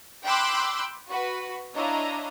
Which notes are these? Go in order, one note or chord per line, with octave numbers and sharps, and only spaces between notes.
G5 B5 C6 D6 E6 F#6
F#4 B4
D4 E4 C#5 D#5 F5 A#5